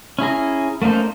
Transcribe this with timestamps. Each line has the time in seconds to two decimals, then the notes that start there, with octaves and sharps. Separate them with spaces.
0.19 C#4 E4 G#4 A#5
0.82 A3 A#3 C#4 D#4 C5